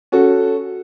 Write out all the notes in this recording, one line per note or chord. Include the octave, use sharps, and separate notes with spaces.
C#4 F#4 A4